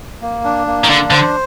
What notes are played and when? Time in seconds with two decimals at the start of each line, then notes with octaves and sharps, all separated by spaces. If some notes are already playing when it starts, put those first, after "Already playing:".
0.22 A#3
0.44 D4
0.67 A#3
0.84 D#3
0.89 D3 D4
1.10 D3 C5